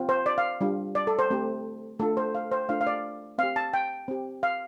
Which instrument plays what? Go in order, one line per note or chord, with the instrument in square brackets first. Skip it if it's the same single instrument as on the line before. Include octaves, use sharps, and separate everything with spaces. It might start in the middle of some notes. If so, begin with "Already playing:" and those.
Already playing: [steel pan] C4 F4
C5
D5
F5
G3 D4 F4
D5
A4
C5
A3 C4 G4
A3 D4 F4 A4
C5
F5
C5
A3 D4 F4 F5
F5
D5
C4 F5
G4
A5
G5
C4 G4
F5